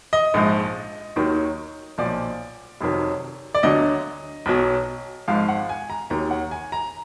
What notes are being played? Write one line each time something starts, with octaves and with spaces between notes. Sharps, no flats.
D#5
A#1 G#2 F3
D#2 D#3 F#3
B1 A#2 F3 D5
F1 F2 D#3 F#3
D5
D2 D3 F#3 D#5
B1 B2 F#3
G#1 G#2 F3 F5
F#5
G#5
A#5
D#2 D#3 F#3 A#5
F#5
G#5
A#5